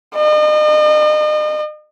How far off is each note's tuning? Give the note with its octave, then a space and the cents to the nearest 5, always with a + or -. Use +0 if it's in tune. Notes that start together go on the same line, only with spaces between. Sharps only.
D#5 -40